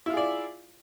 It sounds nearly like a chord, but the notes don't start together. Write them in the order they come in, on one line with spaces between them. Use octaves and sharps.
E4 F4 G#4 D5